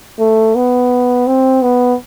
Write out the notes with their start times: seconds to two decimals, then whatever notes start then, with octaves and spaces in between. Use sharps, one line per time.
0.20 A3
0.55 B3
1.27 C4
1.62 B3